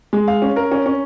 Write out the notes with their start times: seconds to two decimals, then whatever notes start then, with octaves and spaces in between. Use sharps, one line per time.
0.13 G#3
0.28 F5
0.42 C#4
0.56 A#4
0.72 C#4
0.86 C#4